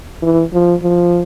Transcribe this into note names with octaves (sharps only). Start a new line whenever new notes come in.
E3
F3
F3